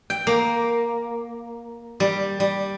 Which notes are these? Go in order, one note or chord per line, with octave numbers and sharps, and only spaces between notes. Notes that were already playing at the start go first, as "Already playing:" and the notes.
G5
A#3
G3
G3